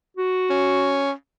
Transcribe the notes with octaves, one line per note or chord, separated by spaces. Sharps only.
F#4
C#4